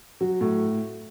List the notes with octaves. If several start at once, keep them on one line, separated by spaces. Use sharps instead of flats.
F#3 F#4
A2